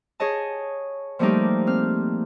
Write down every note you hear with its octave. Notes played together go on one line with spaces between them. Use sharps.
G#4 C#5 D#5 A5
F3 G3 A3 A#3 D#4 G4
C4 F6